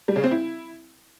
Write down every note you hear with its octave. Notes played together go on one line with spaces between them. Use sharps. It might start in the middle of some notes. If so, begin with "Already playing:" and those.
G3
C#3
C4
E4